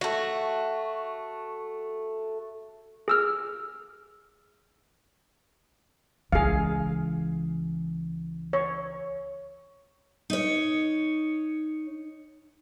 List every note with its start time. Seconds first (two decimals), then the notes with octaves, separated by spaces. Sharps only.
0.01 A3 F#4
3.08 G#4 E6 F6
6.32 C#2 E3 G#4 F5
8.53 C#5
10.30 D#4 C#5